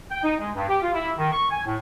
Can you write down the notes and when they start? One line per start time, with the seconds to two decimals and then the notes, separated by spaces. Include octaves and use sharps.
0.11 G5
0.24 D#4
0.40 G#3
0.56 G2
0.68 G4
0.82 F4
0.94 E4
1.18 D#3
1.32 C#6
1.50 G#5
1.66 A2